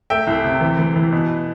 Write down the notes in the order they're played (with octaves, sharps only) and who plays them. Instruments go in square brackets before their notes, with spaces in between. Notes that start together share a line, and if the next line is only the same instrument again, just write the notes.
[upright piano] A3 E5 G5
C2
C3
E3
E3
E3
B2